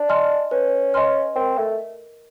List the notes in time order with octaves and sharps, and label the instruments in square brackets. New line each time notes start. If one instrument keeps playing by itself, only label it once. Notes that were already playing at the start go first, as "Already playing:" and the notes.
Already playing: [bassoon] D4
[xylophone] D#5 G#5 C6 F6
[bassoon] C#4 [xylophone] B4
[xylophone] D#5 G#5 C6 F6
[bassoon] C4 [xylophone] A#4
[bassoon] A3